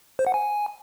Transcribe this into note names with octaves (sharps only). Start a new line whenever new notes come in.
C5
F#5
G#5